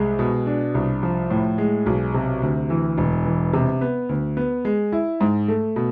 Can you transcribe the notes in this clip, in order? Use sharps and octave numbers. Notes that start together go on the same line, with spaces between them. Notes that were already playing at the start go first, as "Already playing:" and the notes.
Already playing: C2 G#3
B2
D4
C2
F3
A2
G#3
B1
C3
D2
E3
E1
E3
C3
B3
D2
B3
G#3
E4
G#2
A3
B2